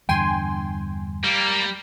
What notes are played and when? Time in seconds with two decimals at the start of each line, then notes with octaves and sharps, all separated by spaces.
0.09 E2 G2 D3 G5 G#5 C6
1.24 G3 A#3